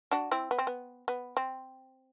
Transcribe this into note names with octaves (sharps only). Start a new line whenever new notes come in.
D4 F#4
C4 E4
B3
C4
B3
B3
C4